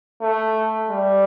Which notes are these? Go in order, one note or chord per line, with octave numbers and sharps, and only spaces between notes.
A3
G3